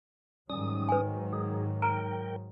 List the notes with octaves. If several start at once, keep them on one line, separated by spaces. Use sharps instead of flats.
G#2 D#3 F#3 G3 C#4 D#6
B4 G#5
G#4
A#4 G5 A#5